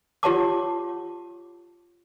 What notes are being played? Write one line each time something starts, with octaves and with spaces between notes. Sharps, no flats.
F4 G4 C#5 F#5 A5 D6